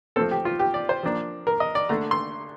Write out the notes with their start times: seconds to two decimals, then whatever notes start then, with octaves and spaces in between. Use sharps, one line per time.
0.16 F3 A3 C4 A4
0.31 G4
0.45 F4
0.59 G4
0.74 D5
0.89 C5
1.03 F3 A#3 D4
1.47 A#4
1.60 D#5
1.75 D5
1.89 D3 A3 D4 A#5
2.11 C6